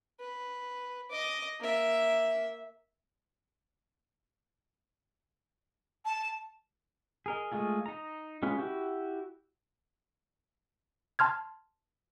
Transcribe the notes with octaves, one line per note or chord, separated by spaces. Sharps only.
B4
D#5 D6
A#3 E5
A5
G#4 A#4 D#5
G#3 A3 F4 G#4
D#4 A#5
G#3 C#4 F4 B4
E4 F#4 G4
A5 C6 F6 G#6